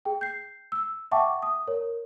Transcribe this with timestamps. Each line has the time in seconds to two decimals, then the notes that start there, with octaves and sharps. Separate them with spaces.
0.05 G#4 G5
0.21 G6 C7
0.72 E6
1.12 E5 F#5 G5 A5 C#6 D6
1.42 D#6
1.67 A#4 C#5